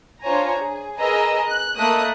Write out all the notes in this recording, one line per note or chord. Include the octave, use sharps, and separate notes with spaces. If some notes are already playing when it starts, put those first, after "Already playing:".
D4 F4 C5 C#5 G#5 A#5
G#4
G#4 A#4 B4 D#5 A#5 E6
F#6
A3 A#3 D#5 B5 D#6 F#6